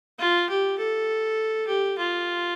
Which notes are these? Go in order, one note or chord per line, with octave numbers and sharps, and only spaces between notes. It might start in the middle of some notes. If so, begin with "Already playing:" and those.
F4
G4
A4
G4
F4